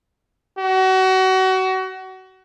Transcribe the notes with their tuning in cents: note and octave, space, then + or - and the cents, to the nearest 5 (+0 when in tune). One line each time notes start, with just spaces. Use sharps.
F#4 +30